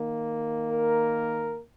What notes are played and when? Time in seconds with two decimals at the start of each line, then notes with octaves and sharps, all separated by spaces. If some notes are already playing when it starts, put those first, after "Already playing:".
Already playing: D#3 A#3
0.70 A#4